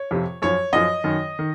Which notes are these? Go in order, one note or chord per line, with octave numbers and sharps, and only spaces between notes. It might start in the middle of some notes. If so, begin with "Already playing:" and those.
Already playing: C#5
F2 C3 F3
F#2 F3 C#5
F#2 F3 D#5
F#2 D#3
D#3